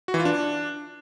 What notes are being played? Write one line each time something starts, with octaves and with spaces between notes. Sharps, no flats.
F#4
E3
F4
D4